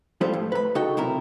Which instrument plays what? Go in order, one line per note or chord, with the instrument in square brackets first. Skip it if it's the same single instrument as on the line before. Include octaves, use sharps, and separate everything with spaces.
[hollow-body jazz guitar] F3 G3 B3 F4 A4 C5
A2
B4 B5
C#3 D#4 F#4 A4 G5
B1 C3 E4 A#4